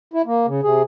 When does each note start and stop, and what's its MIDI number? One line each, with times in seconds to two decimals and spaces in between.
0.14 0.22 64
0.26 0.46 58
0.47 0.61 49
0.63 0.82 48
0.63 0.82 68